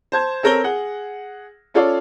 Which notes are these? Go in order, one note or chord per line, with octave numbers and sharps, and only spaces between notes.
C5 A5 G#6
C4 A4 A#4 C#5 A#6 G7
G#4 F#5
C#4 F4 A4 C#5 D5 F5